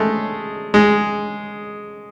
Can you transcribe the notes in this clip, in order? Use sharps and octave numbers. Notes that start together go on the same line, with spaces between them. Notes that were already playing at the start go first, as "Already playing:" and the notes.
Already playing: G#3 A3
G#3